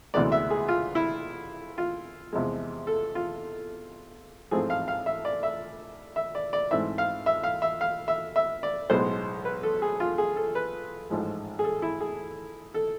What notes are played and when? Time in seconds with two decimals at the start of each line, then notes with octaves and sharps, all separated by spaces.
0.14 D2 C3 E3 G#3 B3 D5
0.32 E5
0.51 G#4
0.68 F4
0.95 E4
1.78 F4
2.33 E2 C3 F3 G#3
2.87 A4
3.15 F4
4.51 A1 G#2 F3 A3 C4 G#4
4.70 F5
4.88 F5
5.06 E5
5.25 D5
5.43 E5
6.16 E5
6.35 D5
6.53 D5
6.71 G#2 E3 A3 C4 E5
6.98 F5
7.26 E5
7.44 F5
7.62 E5
7.81 F5
8.08 E5
8.36 E5
8.63 D5
8.90 B1 A2 G#3 B3 C5
9.45 B4
9.63 A4
9.82 G#4
10.00 F4
10.18 G#4
10.36 A4
10.55 B4
11.10 A1 G#2 F3 G#3
11.59 G#4
11.64 A4
11.82 E4
12.01 G#4
12.74 A4